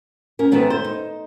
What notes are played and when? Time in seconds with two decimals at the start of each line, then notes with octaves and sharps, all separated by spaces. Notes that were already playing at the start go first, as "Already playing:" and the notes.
0.39 C#4 A#4
0.52 G#2 D#3 B3 A4 B4 E5
0.70 C5
0.85 D#4